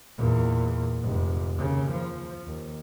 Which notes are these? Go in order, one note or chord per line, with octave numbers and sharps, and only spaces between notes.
E2 A#2
F1 G#2
D#2 C#3
F3
D#2